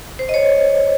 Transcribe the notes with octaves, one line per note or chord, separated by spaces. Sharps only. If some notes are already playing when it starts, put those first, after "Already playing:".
C5
D#5
C#5